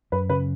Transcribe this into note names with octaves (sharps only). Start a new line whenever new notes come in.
F#2 B4
C#3 B4